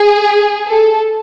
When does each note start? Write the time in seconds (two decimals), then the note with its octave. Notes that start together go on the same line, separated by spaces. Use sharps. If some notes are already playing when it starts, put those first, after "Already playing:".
Already playing: G#4
0.68 A4